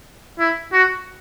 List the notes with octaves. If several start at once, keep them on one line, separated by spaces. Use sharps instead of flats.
E4
F#4